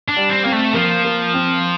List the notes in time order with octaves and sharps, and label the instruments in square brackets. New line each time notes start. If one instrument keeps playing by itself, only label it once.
[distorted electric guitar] D4
[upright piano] G3
[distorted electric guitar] C4
[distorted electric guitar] A#3 [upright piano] C4
[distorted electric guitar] A3
[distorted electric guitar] F3 [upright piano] A#3
[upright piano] A#3
C4